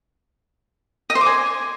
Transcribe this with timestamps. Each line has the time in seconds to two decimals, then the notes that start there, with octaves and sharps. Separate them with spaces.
1.10 D#5
1.15 C5
1.21 D6
1.26 G#5